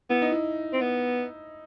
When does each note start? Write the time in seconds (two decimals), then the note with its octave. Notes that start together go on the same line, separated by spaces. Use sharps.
0.10 B3 E4
0.22 D#4
0.32 E4
0.73 C4
0.81 B3